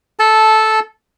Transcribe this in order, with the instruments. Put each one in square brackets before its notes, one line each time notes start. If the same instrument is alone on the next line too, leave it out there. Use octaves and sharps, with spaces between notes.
[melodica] A4 A5